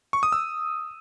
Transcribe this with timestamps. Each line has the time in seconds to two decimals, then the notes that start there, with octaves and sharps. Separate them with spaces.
0.13 C#6
0.23 D#6
0.32 E6